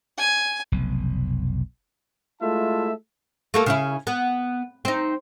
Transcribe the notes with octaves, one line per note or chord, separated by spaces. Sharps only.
G#5
F1 B1
G#3 A3 E4 F4 E5 A5
A3 A#3 A4
C#3 C#4 E4
B3
C4 D#4